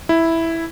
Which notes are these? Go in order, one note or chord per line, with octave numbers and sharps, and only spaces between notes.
E4